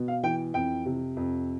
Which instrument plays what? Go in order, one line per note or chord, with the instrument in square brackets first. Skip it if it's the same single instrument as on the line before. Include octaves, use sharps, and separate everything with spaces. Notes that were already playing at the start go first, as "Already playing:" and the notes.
Already playing: [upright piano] B2
F5
E3 G5
F2 G5
C3
F2